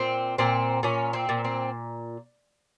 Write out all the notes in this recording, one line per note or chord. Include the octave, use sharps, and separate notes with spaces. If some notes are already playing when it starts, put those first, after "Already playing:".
Already playing: A#2 C4
A#2 C4
A#2 C#4
C4
A#2
C4